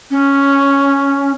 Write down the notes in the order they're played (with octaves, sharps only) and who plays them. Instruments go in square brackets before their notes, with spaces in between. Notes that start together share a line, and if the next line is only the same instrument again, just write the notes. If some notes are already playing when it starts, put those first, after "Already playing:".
[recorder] C#4